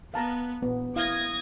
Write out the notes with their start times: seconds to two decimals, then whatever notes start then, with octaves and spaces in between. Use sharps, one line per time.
0.14 B3 F5 A5 A#5
0.62 A#1 B3
0.96 E4 F5 D#6 G#6 A#6